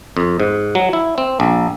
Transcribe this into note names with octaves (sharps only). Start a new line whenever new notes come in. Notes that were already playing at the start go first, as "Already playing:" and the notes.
F2
G#2
F#3
E4
C4
A#1